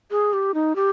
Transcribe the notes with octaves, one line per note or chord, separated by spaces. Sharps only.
G#4
G4
D#4
G4